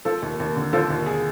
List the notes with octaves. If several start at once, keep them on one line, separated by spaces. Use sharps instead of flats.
F3 A4
D#2
D#2
D3
F3 A4
D#2
G#4